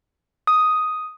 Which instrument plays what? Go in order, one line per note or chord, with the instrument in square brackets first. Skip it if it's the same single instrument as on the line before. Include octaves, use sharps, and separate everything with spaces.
[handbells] D#6